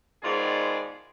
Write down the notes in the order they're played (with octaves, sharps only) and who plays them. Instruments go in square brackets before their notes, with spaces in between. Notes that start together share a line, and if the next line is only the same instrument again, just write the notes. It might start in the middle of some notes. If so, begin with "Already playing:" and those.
[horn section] G#2 B2 D#3 F4 G#4 D5